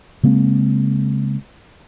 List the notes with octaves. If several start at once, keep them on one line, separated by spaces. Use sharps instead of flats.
C#3 G#3 A#3 C4